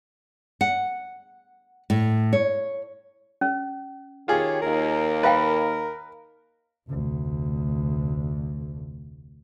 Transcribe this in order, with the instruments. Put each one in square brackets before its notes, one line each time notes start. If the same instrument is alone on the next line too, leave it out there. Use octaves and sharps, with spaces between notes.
[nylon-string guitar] F#5
A2
C#5
[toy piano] C#4
[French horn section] D#3 C#5 [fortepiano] F4 G#4 [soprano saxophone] G4
[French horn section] D#2 [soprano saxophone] A#4
[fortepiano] B4 [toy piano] D#5 F5 G5
[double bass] F1 D2